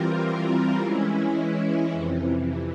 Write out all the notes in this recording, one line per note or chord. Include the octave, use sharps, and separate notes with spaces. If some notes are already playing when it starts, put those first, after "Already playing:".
Already playing: E3 G3 C4 F4 A#4
E3 G#3 C#4 E4
F2 C3 E3